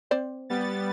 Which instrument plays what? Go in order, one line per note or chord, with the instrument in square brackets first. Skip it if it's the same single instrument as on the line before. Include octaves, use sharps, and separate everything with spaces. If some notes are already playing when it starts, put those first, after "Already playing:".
[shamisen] C4 C5 D5
[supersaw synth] G3 B3 A6